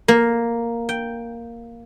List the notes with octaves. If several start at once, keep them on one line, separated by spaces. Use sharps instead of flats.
A#3
G5